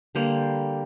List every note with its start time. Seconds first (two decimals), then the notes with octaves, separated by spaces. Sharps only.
0.15 D3 G3 A#3 C5